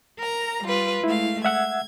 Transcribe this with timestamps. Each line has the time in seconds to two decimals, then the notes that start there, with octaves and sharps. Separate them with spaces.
0.18 A#4 A#5
0.65 G3 F4 B4
1.04 G#3 A3 E4 F5
1.45 E5 F#5 E6 G#6